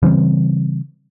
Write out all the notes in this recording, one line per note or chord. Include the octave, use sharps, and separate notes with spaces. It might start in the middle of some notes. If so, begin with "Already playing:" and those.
C#3 E3 G3 C4